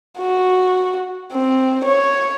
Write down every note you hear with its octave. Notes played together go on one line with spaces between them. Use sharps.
F#4
C4
C#5